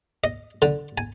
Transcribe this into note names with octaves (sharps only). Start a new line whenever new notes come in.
D#5
D3
G#5